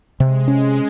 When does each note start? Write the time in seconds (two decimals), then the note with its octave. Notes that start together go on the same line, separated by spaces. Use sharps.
0.20 C3 G#3
0.48 C#4